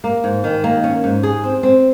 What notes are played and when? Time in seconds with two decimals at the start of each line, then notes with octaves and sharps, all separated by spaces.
0.04 A#3
0.24 G#2
0.44 D#3
0.64 A#3
0.84 C#4
1.04 G#2
1.23 G#4
1.44 C4
1.63 C4